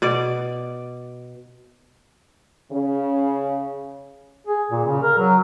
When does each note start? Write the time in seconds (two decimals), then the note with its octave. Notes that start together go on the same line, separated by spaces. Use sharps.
0.02 B2 D5
2.72 C#3
4.47 G#4
4.71 A#2
4.86 C#3
5.03 A#4
5.18 F#3